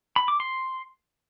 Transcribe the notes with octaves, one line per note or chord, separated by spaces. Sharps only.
B5
D6
C6